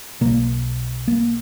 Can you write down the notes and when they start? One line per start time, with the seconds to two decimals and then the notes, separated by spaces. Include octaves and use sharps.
0.21 B1 B2 A#3
1.08 A#3